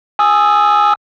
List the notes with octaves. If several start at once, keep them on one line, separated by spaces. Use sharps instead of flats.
G#5 D#6 E6